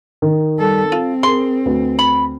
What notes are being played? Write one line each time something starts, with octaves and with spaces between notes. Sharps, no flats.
D#3
G3 A4
C4 F4
G#4 A#4 C6
D2 B4
B5